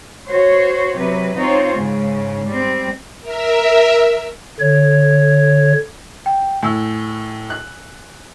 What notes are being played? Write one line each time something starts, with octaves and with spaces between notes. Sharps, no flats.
F#4 C5 C#5
C3 F#3 B4
C4 D#4 F4 C5 C#5
G#2 C#3
G3 C4
A#4 E5
D3 C#5
G5
A2 G#5 E6
F#6